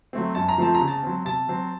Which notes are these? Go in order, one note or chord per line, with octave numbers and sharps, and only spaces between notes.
F#3 A3 C4
F#2 A5
A#5
F3 A3 C4 A5
A#5
C#3
A5
F#3 C4
C3 A5
F#3 C4